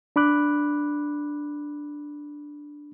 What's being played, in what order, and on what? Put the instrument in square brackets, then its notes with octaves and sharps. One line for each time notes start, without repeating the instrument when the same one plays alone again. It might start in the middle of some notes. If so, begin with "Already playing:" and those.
[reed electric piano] D4 B5 D6 F#6